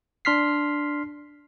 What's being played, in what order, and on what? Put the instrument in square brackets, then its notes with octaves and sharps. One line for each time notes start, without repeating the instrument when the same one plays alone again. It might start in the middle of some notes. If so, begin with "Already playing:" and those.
[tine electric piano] D4 C6 F6 B6 C7